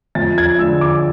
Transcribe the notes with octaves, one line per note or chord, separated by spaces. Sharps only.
F2 A6
G#6
D3 G#3 E6
D6